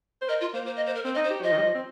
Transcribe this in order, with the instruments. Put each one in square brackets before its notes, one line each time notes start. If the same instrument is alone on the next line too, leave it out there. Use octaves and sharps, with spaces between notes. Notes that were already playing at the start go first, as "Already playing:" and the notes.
[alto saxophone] C5
[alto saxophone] A#4 [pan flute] D#5
[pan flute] F4
[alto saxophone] A#3 [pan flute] C5
[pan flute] C5
D#5
C5
A#4
[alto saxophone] C4 [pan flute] C5
[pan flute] D#5
[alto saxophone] D#4
[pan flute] C5
[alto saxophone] G4
[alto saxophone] F3 [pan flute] D#5
[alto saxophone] D#3
G3
F3
C4